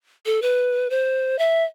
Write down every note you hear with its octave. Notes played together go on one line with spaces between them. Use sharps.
A4
B4
C5
E5